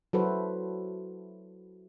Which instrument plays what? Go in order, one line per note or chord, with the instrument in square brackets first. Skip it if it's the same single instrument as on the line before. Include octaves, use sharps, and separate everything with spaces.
[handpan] F#3 E4 F#4 A4 B4 C5